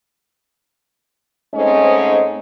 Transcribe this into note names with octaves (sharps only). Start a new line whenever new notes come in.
G#2 A3 C4 C#4 D#5